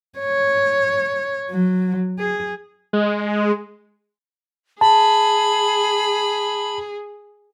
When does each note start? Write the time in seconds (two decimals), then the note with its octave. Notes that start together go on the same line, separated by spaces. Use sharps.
0.19 C#5
1.50 F#3
2.19 G#4
2.93 G#3
4.81 G#4 A5 B5